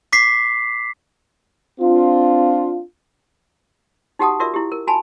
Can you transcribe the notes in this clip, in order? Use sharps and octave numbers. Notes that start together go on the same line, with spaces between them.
D6 B6 C7
C4 D4 F4
D#4 F#4 G4 F#5 A5 D#6
F4 F#4 A#4 D5 E5
E4 G4
A#4
F#4 G#5 A5 B5